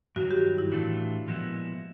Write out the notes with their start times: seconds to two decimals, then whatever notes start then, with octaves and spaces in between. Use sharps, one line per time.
0.16 G2 D#3 F#3 F#4
0.31 G4
0.58 E4
0.71 A2 E3 A3 D4 E4 F4
1.27 A#2 F3 G#3 B3 E4